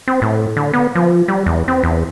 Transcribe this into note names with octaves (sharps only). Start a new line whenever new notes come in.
C4
A2
D3
B3
F3
G3
E2
C4
E2